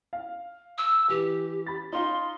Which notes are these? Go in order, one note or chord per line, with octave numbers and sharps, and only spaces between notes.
F5
E6
E3 G4
B5 A6
D#4 F4 C6